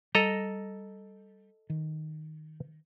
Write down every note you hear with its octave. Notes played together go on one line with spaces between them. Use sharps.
G3 A4 D#5 A#5
D#3